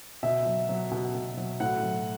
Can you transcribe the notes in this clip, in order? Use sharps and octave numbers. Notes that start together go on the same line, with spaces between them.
B2 E5
F#3
F#3
B2
B2
F#3
A2 F#5
F#3